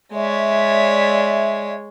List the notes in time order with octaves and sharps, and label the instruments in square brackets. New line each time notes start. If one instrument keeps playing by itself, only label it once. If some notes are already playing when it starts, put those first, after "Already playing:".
[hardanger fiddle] G#3 C#5 [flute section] D5 E5